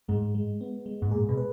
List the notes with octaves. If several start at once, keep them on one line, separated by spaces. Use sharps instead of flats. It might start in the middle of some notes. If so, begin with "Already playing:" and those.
G#2 G#3
G#3
B3
G#3
G#2
A#2 G#4
B2
B4